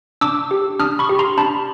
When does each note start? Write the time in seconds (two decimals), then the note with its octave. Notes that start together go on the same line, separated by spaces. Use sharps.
0.21 D4 D6 E6
0.51 G4
0.79 D4 D#6 F6
0.99 B5 C#6
1.09 G4
1.19 A#5 C6
1.38 D4 A5 B5